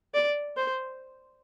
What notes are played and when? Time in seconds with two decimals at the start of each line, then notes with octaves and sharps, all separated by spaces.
0.14 D5
0.57 C5